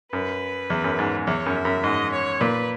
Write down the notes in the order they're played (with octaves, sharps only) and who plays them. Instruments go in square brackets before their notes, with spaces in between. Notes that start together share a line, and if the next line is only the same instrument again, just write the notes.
[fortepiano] F#2 [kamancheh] B4
[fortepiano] E2
F#2
G#2
[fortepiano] E2 [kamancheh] C#5
[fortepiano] F#2
[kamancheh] E5
[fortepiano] F#2
[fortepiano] G#2 [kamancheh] D#5
[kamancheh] C#5
[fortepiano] A#2 [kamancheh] B4